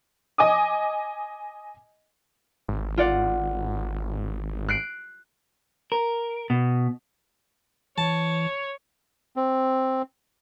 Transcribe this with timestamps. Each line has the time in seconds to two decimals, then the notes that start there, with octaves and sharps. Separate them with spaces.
0.38 D#5 G#5 D6 D#6
2.68 G#1
2.97 F4 D5 F#5
4.68 F#6 C7 D7
5.92 A#4
6.50 B2
7.98 E3 C#5 A5
9.36 C4